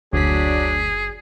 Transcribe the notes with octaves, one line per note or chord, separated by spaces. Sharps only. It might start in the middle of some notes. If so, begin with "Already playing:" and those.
F#1 D2 F#3 D4 G#4 B6